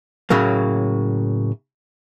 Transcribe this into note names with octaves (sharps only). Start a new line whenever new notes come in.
A2 C#3 F#3 A#3